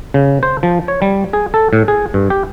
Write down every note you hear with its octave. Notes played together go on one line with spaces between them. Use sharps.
C#3
C5
F3
C#5
G3
G#4
A4
A2
G#4
G2
G4